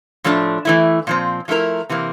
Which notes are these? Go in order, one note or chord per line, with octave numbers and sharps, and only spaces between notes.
A2 F3 A3 D4
E3 A3 E4
A#2 F3 C4
F3 A3 E4 A#4
C3 E3 A#3